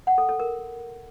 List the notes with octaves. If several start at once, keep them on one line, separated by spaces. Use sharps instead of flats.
F#5
A4
A4
A#4